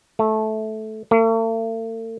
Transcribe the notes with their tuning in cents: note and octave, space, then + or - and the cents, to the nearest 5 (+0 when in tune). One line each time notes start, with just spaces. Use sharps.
A3 -15
A3 +45